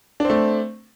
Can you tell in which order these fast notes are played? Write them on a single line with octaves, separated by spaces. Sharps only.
D4 C4 A3